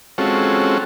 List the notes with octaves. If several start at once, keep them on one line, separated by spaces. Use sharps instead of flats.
G#3 C4 C#4 F4 F#4 A4